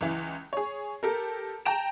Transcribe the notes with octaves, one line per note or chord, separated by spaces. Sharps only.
C#2 E3
G#4 C#5
G4 A4 A#4
G5 A5 A#5 D7 E7